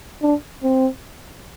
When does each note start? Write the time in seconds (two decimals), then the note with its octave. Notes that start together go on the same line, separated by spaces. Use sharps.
0.22 D4
0.63 C4